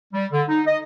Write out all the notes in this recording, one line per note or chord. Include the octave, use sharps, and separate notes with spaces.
G3
D3
D#4
D#5